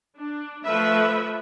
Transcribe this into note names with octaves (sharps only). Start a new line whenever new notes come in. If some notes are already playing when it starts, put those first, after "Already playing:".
D4
F3 A3 B4 E5